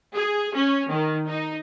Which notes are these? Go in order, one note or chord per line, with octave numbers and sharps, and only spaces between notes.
G#4
C#4
D#3
D#4